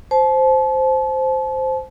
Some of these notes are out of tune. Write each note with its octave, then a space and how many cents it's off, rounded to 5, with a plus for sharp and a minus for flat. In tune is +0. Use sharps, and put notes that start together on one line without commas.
C5 +0 A5 -35